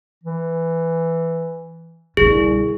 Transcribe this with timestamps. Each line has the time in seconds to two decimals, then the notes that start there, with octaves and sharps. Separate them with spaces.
0.24 E3
2.17 C2 B2 D3 G#4